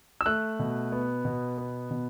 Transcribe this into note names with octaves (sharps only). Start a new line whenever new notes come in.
E6
A3 F#6
B2
B3
B2
B3
B2